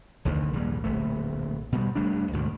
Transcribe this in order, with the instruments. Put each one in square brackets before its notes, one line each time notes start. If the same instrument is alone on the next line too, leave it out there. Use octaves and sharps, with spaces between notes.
[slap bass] F1 D2 D3 D#3
A#1 D#2 G#2 G3
D1 A#1 A3
B2 G3
F1 G3 A3 D4
D2 G#2 B2 D#3